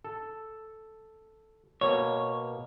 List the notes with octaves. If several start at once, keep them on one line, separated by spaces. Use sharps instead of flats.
A4
B2 A#3 C#5